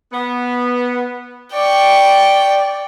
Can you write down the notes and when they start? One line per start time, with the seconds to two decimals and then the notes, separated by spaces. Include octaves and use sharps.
0.13 B3
1.54 D5 G5 C#6